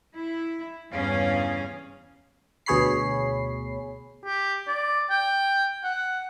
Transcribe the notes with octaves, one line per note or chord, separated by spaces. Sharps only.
E4
E2 G2 C#3 C#4 G#4 F5
D2 B2 G#4 C#5 B5 C7
G4
D5
G5
F#5